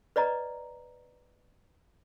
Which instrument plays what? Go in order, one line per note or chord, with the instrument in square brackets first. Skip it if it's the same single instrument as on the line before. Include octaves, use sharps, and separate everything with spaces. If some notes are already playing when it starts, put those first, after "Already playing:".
[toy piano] B4 D5 D#5 A#5